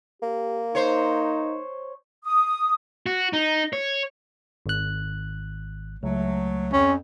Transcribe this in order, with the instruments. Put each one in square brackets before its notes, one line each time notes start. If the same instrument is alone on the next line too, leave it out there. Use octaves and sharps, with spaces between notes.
[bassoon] A#3 [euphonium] G4
[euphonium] D#4 [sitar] C5 C#5
[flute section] D#6
[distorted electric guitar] F#4
D#4
C#5
[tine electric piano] G#1 F#6
[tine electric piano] C#2 [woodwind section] F#3 A3
[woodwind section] F2 [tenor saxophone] C#4